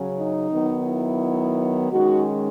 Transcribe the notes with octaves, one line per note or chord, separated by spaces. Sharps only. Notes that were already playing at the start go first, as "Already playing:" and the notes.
Already playing: C#3 F#3 C#4
D#4
D#3 F#3 B3
E4
D#3 G#3 C#4 D#4 F#4